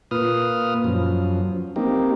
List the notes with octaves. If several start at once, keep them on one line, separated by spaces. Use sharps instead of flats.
A#2 F4 B4 D#6 F6
F#2 F3
A#3 C4 D#4 G4